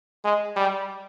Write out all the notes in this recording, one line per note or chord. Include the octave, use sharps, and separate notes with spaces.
G#3
G3